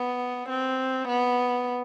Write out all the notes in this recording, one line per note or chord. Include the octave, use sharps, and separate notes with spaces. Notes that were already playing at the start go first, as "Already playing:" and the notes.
Already playing: B3
C4
B3